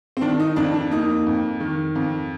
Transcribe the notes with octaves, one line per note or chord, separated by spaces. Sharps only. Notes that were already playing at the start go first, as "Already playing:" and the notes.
C4
D#3 D4
D#4
F2 D4
D4
A#3 D#4
F2
D#3
F2